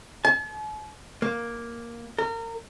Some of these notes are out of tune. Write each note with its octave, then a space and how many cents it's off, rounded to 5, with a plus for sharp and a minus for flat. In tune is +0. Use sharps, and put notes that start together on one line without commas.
A5 -45
A#3 +5
A#4 -30